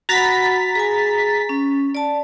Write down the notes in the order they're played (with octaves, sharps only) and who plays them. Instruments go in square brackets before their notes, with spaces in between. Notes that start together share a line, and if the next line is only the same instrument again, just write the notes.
[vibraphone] F#4 F#5 B5 [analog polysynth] A#5 A6 B6
[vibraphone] G#4 G#5
C#4
D5 A5